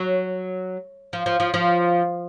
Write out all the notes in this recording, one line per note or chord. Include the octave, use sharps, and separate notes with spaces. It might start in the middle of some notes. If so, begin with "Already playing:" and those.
Already playing: F#3
F3
F3
F3
F3